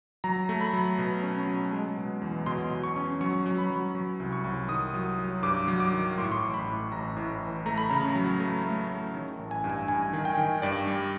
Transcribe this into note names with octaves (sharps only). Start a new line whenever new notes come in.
F#3 A#5
A3
B5
F#3
B2
C#4
F#3
G#3
B2
E2
B2 C6
B2
C#6
C#4
F#3 C#6
F#3
B5
F#3
F#3
C2
C#6
C2
D#3 D#6
F#3
F#3
G2 D6
F#3
D6
D#3
A2 C6
C#6
C6
C#6
A1 C6
B5
A2
A1 A#5
A2
E3
A3 A#5
B5
C#3 A#5
A#5
F#3
A3
A3
A3
D#3
A1
G#5
G2
G#5
G2 G#5
D#3
G5
D#3
G2 D5
G3